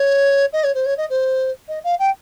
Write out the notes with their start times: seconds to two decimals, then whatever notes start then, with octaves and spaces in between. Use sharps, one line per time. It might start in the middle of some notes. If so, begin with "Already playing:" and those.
Already playing: C#5
0.53 D#5
0.63 C#5
0.74 C5
0.86 C#5
0.97 D#5
1.10 C5
1.68 D#5
1.84 F5
1.99 G5